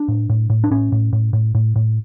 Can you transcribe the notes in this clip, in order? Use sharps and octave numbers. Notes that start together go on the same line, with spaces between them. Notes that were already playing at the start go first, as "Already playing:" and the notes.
Already playing: D4
A2
A2
A2
D4
A2 C#4
A2
A2
A2
A2
A2